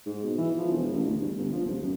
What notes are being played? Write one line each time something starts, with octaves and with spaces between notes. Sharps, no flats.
G#2
B2
E3
F3
E1
A1
D2
G2
G1
F3
D#1
F#2